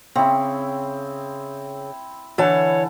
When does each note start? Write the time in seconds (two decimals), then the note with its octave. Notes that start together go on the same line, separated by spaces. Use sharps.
0.15 C#3 C4 E4
2.38 D3 E3 C#5 A5